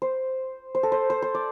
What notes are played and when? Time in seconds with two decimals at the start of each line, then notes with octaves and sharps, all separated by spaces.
0.02 C5
0.75 C5
0.83 A4
0.92 C5
1.10 C5
1.22 C5
1.35 D5